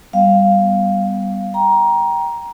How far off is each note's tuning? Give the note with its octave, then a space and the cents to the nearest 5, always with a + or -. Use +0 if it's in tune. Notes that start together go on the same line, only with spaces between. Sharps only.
G3 +0 B3 +0 F5 +0
G5 +0 A#5 +15